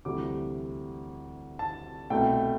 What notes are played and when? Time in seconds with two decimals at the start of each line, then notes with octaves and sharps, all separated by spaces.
0.05 D2 C3 E3 G3 D6
1.59 A5
2.10 C2 B2 A3 G5